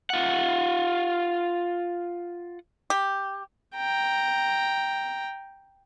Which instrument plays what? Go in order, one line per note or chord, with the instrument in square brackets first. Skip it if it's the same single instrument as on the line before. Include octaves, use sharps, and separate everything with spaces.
[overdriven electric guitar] F4 F#5
[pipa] G4
[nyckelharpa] G5 A#5